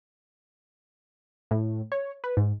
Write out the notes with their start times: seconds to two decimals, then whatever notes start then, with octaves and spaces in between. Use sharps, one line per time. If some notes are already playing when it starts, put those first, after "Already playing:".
1.51 A2
1.92 C#5
2.24 B4
2.37 G#2